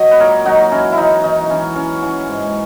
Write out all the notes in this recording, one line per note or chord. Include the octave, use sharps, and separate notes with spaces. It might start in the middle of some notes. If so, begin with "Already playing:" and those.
Already playing: F#3 F#4 D#5
B4
A#2 A#4 C#5
F#3 D#4 F#4
E3 C#4 E4
E4
E3 D#4
E3 D#4
E3 C#4
E3 C#4
E3 C#4
G#2